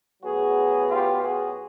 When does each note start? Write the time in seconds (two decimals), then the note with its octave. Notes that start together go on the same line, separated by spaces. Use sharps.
0.22 A2 F#3 B3 F#4 G#4
0.88 F4 G4
1.22 F#4 G#4